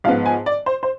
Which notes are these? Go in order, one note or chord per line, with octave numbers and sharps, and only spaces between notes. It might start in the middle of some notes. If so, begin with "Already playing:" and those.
G#2 F3 B3 F5
G#5
D5
C5
C5